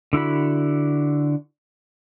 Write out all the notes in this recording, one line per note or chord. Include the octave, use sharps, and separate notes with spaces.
D3 E4 F#4 B5